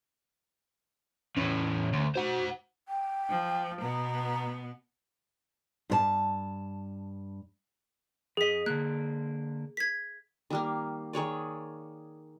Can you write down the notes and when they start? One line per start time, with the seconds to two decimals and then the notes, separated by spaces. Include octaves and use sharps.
1.37 E2 A2 C#4
1.93 D2
2.15 F#4 C5 F#5
2.88 G5
3.29 F3
3.81 B2 B3 A#5
5.90 G2 B4 A5
8.37 F2 G#4 D#5 B6
8.66 D3 A#3 F#6
9.77 G#6 B6
10.50 D#3 G3 A#3
11.13 D#3 G#4 C#5 D5